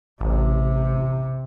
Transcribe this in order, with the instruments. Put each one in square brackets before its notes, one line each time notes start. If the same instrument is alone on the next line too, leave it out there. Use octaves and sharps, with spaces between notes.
[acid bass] A1 [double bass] C3